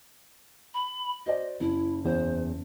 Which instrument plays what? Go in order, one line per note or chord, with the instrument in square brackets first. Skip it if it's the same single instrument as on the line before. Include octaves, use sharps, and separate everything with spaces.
[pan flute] B5
[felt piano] F#4 C5 D5 [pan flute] D#5
[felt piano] F#1 [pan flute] E4
[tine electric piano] E2 [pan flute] C5